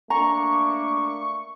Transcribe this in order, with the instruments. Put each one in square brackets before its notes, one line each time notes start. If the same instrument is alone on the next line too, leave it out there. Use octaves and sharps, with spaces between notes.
[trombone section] A3 A#3 D4 [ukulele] A#5 [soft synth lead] C#6